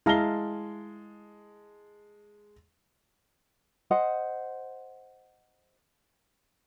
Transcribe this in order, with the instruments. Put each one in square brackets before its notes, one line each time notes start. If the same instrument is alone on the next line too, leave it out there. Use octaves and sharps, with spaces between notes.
[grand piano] G#3 A5 G7 [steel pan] E4 F5 A#5
[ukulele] C5 D#5 F#5